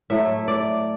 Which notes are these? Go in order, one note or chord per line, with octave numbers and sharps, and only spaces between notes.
A2 F#3 A3 E4 E5
D5